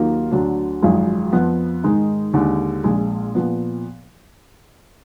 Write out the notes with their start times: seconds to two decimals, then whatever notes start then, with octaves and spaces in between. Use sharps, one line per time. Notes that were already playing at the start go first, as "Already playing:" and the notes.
Already playing: D#2 D#3 F#3 A#3 F4
0.31 D2 D3 F#3 D4
0.82 G#1 F#2 F3 G#3
1.33 F2 F3 B3
1.84 G#2 D#3 G#3 D#4
2.33 D#2 D3 G#3
2.84 A#1 A#2 G#3
3.35 A#2 F3 B3